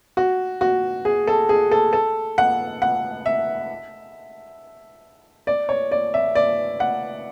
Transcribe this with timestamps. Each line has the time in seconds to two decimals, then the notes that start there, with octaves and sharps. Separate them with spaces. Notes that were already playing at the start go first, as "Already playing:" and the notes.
0.17 F#4
0.61 F#4
1.05 G#4
1.27 A4
1.49 G#4
1.71 A4
1.93 A4
2.38 F#5
2.82 F#5
3.26 E5
5.47 D5
5.69 C#5
5.91 D5
6.14 E5
6.35 D5
6.80 F#5